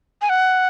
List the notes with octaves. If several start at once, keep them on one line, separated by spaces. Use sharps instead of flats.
G#5
F#5